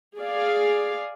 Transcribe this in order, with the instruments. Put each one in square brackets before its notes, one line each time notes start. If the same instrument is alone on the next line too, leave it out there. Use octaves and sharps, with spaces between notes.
[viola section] G#4 D5 F5